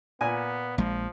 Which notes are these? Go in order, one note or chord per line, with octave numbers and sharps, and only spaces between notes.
A#2 B3 G#5
A#1 F3 G#3